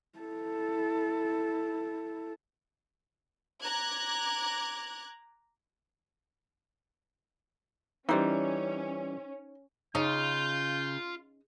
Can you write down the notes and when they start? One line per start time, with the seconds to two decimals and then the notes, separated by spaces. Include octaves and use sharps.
0.19 E4 A4
3.62 A#5 D6 F#6 G#6
8.09 E3 G3 C#4 D#4 C5
9.95 C#3 C#4 D#4 F4 G6